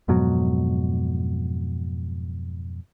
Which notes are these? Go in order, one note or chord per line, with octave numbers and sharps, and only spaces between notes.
F2 G#2 B2 F#3